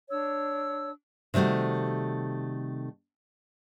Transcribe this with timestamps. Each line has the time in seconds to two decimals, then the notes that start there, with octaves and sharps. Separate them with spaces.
0.10 D4 C#5 E6
1.34 C3 D#3 G3 A3 F#4